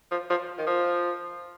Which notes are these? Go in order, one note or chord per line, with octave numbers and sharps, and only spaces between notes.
F3
F3
D#3
F3